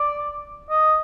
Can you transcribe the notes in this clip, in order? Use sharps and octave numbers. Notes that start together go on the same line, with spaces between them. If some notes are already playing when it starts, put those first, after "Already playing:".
Already playing: D5
D#5